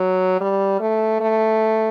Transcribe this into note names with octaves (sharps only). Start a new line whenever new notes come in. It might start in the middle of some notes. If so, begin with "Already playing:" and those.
Already playing: F#3
G3
A3
A3